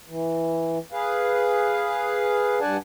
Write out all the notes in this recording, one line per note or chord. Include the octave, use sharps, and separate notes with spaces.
E3
G#4 B4 F5
G2 D4 D5 F#5 G#5 A5